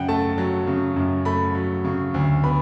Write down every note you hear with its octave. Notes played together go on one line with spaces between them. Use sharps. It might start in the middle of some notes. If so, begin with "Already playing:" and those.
Already playing: F#2 C#3 F#5 G5
A3 A5
F#3
C#3
F#2
A3 B5
F#3
C#3
D2
B3 B5